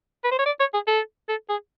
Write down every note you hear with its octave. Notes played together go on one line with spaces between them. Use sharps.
B4
C5
C#5
D5
C#5
G#4
A4
A4
G#4